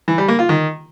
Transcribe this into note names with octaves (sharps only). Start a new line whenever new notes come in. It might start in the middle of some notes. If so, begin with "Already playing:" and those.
E3
G3
A#3
F4
D#3